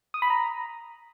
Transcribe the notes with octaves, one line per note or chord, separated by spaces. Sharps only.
D#6
B5
A#5